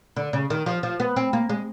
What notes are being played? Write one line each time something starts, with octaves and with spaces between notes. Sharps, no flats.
D3
C#3
D#3
F3
F3
B3
C4
A#3
G#3